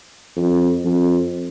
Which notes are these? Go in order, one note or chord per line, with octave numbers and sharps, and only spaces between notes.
F2
F2